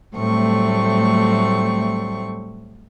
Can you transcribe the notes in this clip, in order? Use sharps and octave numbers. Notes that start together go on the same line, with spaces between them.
A2 F#3 G3 A3 C4 C#6